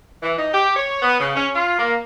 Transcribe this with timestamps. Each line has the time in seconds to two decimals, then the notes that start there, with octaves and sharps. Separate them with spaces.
0.22 E3
0.37 D#4
0.53 G4
0.76 C#5
1.03 B3
1.20 C#3
1.36 C#4
1.55 F4
1.78 A#3